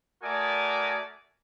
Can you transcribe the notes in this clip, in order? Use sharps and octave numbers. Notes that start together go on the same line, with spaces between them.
A3 F#4 A#4 D5 G#5 D#6